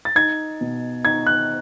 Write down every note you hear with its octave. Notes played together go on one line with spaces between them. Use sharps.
A6
D#4 G#6
B2
D#4 G#6
F#6